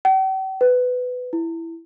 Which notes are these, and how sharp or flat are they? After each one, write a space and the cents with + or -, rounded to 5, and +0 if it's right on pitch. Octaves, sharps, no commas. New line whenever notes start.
G5 -45
B4 +15
E4 +5